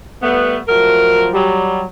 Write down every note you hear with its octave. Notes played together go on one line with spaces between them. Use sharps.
G3 A3 B3
F3 F#3 A3 A#4
F#3 G3